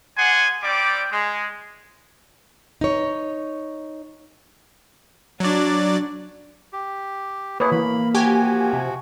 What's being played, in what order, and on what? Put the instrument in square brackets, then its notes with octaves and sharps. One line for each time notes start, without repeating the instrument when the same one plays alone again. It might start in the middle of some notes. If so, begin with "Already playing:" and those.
[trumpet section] G#4 D5 F#5 G#5 C6
G3 C4 D5 G5 D6
G#3
[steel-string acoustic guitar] D#4 C#5
[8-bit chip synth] F#3 D5 [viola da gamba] D4
[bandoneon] G4
[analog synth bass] A#3 [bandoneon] E4 G#4 [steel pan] B4 C#5
[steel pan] E3 [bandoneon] B5
[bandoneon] F3 F#4 [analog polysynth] G4 G#5
[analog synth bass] C3